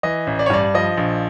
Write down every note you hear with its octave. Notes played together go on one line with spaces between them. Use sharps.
E3 D#5
A1
D5
C#5
G2 D5
F3 D#5
A#1